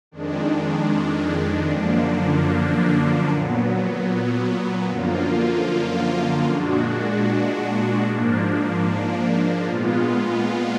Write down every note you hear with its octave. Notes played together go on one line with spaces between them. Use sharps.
F2 D#3 G#3 D4
F#2 D3 F3 A#3 D4
A#2 F#3 B3
F#2 D3 F3 A#3 F4
A#2 G#3 D4 F#4
G#2 F3 A#3 D4
A#2 G#3 B3 F4